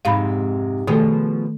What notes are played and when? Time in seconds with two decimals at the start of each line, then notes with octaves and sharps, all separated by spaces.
0.05 F2 G#2 C3 F5 B5
0.87 B2 D#3 F3 A3 G#4 A4